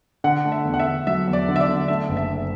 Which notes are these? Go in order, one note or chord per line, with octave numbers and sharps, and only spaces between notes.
D3 F#5
A3
E5
E2
F#5
E5
D3
F#3 E5
E2
D5
D3
E5
D5
D3
A3 E5
F#1
E5
F#1